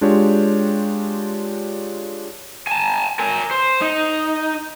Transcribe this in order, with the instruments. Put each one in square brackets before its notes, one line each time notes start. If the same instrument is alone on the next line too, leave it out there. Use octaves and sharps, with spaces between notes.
[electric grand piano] G#3 D4 F4 G4 C#5
[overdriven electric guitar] G#5 A5
A#4 G#5
C5
D#4